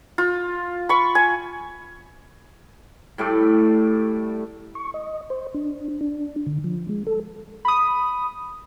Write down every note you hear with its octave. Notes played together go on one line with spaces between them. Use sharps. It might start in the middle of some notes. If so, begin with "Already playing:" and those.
F4
B5 C#6
G#5
A2 G3 A3 D5
C#6
D#5
C5
D4
D4
D3
F3
G#3
A4
B5 D#6